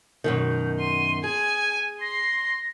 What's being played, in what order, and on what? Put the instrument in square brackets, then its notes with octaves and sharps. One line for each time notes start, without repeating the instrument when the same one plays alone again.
[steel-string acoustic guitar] F#2 B2 D#3 [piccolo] G6
[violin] C6 [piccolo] D#7
[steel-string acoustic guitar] G#4 [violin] G#5 [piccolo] G#6
[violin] C6 C7 [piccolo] A#6